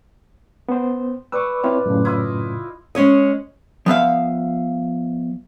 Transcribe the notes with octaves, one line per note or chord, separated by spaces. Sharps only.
B3 C5
B4 D5 C#6 E6
C4 E4 F4 C#5
F#2 A2 C#3
E4 F4 D#5
G#3 C#4 C#5 D#5
F3 B3 E5 F5